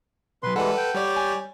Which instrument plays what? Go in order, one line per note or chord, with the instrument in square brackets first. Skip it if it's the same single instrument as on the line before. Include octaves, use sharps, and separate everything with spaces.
[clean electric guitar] B2 F#3 [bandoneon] B4 C6
[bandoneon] E3 G3 G#3 [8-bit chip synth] A4 B4 [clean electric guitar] F#5
[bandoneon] G5
[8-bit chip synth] G3 C#5 D5
[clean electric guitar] G#5